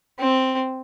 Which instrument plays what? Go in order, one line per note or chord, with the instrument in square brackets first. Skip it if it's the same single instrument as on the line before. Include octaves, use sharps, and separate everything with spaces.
[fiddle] C4